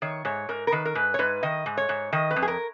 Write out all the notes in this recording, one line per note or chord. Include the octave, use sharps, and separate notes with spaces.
D#3 C#5
G#2 C#5
G#2 A#4
A#4
D#3 B4
A#4
G#2 B4
C#5
G#2 B4
D#3 D#5
G#2
C#5
G#2
D#3 D#5
B4
F2
G#4
A#4